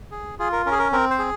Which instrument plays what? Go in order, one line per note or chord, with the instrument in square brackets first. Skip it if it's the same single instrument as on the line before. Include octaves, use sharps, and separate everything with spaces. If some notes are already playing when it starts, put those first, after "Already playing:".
[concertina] G#4
F4 G#4
A#4
C#4 A#4
G#4
A#4
C4 A#4
C5
G#4